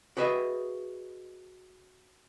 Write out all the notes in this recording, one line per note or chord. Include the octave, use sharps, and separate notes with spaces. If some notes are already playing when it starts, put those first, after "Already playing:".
F#4 G#4 B4 D#5 E5